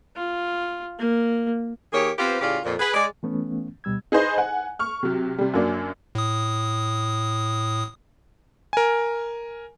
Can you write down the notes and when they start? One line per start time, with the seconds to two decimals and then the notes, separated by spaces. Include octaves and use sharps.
0.16 F4
0.99 A#3
1.93 D#3 A#3 G4 G#4 C#5
2.18 B3 C4 F4 G4 B4 C5
2.40 A2 C#3 F4 G4 D5 F5
2.64 F2 A#2
2.80 G#4 B4
2.94 G#3 D5
3.23 E3 A3 B3 C#4
3.84 D2 B2 G3 E6 G#6
4.12 D#4 G#4 B4 C5 D#5
4.38 F#5 G#5
4.79 C#6 F6
5.03 C3 F#3
5.38 C3 G3
5.54 F#2 F#3 A#3 D4
6.15 A2 D#6
8.73 A#4 G#5